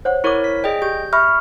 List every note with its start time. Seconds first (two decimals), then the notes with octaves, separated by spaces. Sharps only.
0.05 C5 C#5 F#5
0.24 E4 A#4 C#5 C#6 D6
0.44 B6
0.64 G#4 D5 D#5 G5
0.82 G4 G6
1.13 E5 B5 C#6 F6